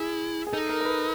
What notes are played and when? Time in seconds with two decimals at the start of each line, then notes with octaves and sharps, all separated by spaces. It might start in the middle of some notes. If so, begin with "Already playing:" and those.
Already playing: E4 G#4
0.47 G#4
0.53 D#4 A4
0.70 A#4
0.81 A#4
0.85 B4